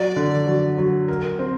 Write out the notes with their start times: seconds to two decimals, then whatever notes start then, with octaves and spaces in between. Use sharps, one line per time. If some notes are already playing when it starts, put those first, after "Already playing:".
Already playing: F#3 D5
0.16 D3
0.47 F#3
0.78 F#3
1.08 A#4
1.39 C4